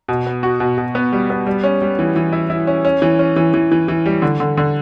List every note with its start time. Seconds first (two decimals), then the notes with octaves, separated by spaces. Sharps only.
0.08 B2
0.26 B3
0.43 F#4
0.60 B2
0.78 B2
0.95 B3
1.12 G3
1.30 B3
1.47 G3
1.64 C#4
1.82 G3
1.99 E3
2.16 E3
2.33 E4
2.50 E4
2.67 C#4
2.85 C#4
3.02 E3
3.19 C#4
3.36 E3
3.54 E3
3.71 E3
3.88 E3
4.06 G3
4.22 D3
4.40 D3
4.58 D3